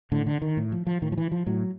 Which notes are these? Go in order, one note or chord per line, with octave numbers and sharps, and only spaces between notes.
A2 D3
D3
D#3
A2
F3
F3
A2 D#3
F3
E3
F3
A2 F#3